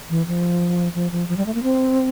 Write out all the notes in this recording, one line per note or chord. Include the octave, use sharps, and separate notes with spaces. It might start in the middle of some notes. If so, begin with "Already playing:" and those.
E3
F3
F3
F3
F3
G3
A3
A#3
C4